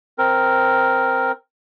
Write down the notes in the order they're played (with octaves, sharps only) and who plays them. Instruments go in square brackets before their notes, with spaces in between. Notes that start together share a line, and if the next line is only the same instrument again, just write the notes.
[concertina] C4 A#4